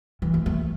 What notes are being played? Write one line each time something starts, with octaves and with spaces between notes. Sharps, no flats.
E3
A3
A3